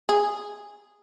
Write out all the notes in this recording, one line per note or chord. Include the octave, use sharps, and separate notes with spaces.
G#4